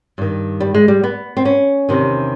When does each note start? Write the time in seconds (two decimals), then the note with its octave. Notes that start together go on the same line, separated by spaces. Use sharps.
0.18 G2 D#3
0.60 G3
0.74 G#3
0.88 G3
1.04 B3
1.37 C4
1.45 C#4
1.89 E2 C3 D#3